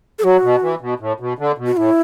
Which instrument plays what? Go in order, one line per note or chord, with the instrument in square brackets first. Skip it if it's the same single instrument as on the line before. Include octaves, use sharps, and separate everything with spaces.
[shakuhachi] A4
[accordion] F#3 [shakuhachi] F#4
[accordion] B2
E3
B2
A2
B2
D3
B2
[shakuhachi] F#4
[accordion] A2 [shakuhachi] E4